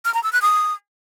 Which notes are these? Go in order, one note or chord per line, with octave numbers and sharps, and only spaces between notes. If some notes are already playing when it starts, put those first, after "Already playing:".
F6
A#5
E6
F#6
D#6